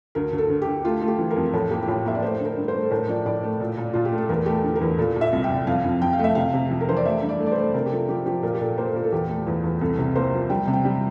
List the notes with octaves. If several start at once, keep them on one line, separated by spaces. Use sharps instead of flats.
D2 A#4
D2
A4
D2
G4
D2
A3 F4
A3 F4
G4
E3
A#4
F2
A2 A4
A#3 G4
G4
A2 F4
A#3 E5
D5
A3 C5
D3
A#4
G2
C5
A3
A4
A2 A#4
F3 D5
A2 D5
A3
A#2
A#2
A#2 F4
G4
A3
A4
E2 A#4
A3 G4
A4
D3
A#4
E2
A#2 A4
A#2
E5
C2
G5
C2
F2 F5
F2
F2 G5
F5
A3 E5
C3 F5
C3
F2
A#4
E3 C5
D5
A3 E5
G2
D5
A3
D5
C5
A3
C3 A#4
G4
F3 A4
F3 G4
F3 G4
A#2 A#4
G4
A#2 A4
A#3 C5
A4
A#2 A#4
A4
E2 G4
A3
E2
E2
C2 A4
C3
A#3 C5
F3
G3 G5
C3
G5
G3